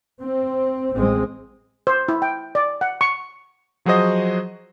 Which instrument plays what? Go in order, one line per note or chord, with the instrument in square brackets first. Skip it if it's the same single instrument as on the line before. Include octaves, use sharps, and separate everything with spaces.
[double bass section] C4
A1 G#3 C4
[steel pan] C5
E4
G5
D5
F#5
C#6
[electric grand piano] F3 F#3 F#4 G#4 C5 D#5